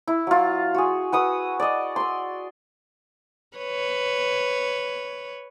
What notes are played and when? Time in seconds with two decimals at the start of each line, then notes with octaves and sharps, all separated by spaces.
0.07 E4
0.27 F#3 F4
0.74 F#4 G#4
1.12 F#4 B4 D#6 E6
1.60 D5 D#5
1.96 C6 E6
3.57 B4 C#5